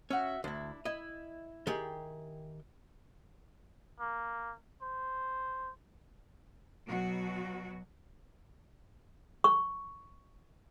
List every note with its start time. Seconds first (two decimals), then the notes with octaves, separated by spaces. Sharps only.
0.10 C#4 F#4 E5
0.44 D2 D4 E4
0.85 E4 D#5
1.67 D#3 G4 G#4
4.00 A#3
4.82 C5
6.87 B2 F#3 F#4
9.44 C#6